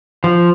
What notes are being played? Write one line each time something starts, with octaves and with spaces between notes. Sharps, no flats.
F3